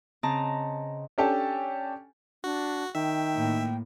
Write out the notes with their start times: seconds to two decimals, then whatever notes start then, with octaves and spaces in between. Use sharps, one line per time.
0.23 C#3 C4 D#5 A5 A#5
1.18 C#4 D4 G4 A4 G#5 A5
2.44 D4 F#4
2.95 D#3 E5 G5
3.35 A2 A#3